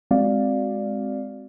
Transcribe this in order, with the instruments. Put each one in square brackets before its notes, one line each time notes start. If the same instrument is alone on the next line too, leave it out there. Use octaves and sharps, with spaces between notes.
[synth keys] G#3 C4 F#4 D5 F5